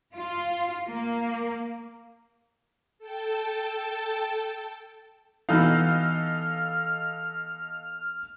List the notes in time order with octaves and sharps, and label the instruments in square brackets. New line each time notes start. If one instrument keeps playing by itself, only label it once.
[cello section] F4
A#3
[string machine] A4 G5 A5
[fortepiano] B2 E3 D#4 [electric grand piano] A4 D#5 F5 [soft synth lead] F6